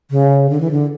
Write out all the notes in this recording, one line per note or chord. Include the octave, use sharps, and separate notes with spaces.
C#3
D3
E3
D3